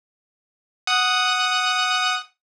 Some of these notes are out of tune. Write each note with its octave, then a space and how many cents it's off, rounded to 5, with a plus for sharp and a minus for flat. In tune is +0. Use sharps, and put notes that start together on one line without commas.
F#5 +0 D#6 +0